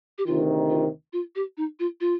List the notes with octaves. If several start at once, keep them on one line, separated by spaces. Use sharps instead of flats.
G4
D2 C3 D#3 F4
F4
F4
G4
D#4
F4
F4